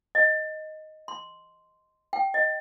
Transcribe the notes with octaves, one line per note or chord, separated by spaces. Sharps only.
D#5
C6
G5
D#5